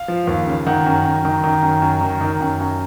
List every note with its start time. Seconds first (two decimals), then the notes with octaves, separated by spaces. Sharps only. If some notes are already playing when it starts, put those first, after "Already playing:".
Already playing: F5
0.08 F3
0.27 D#2
0.47 C#3
0.66 D#3 F#5
0.86 F#2
1.05 F#2
1.25 D#3
1.44 D#3
1.62 F#2
1.82 F#2
2.01 D#3
2.21 D#3
2.41 F#2
2.60 F#2